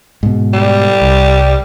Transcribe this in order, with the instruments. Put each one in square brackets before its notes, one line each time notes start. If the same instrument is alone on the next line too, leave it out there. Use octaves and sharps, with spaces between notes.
[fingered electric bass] G#2 B2
[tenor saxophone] G3
[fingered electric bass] C2